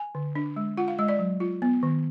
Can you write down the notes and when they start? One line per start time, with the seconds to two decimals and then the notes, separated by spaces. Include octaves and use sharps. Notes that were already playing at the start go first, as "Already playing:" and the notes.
Already playing: G#5
0.15 D3
0.35 D4
0.56 G#3
0.77 F4 F#5
0.88 F5
0.99 G#3 D#5
1.08 D5
1.19 F#3
1.40 F4
1.62 B3
1.83 D#3